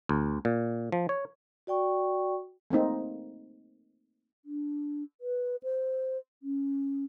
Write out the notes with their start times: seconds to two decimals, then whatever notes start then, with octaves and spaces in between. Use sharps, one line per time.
0.09 D2
0.45 A#2
0.92 F3
1.09 C#5
1.67 F#4 D5 G5 C#6
2.70 A3 A#3 C4 D#4
4.45 D4
5.21 B4
5.63 C5
6.43 C#4